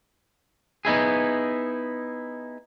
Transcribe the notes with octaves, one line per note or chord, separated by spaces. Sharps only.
B3 D#4 E4 G#4